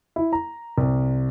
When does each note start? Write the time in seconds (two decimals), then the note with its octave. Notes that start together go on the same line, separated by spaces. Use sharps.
0.16 E4
0.33 A#5
0.78 C2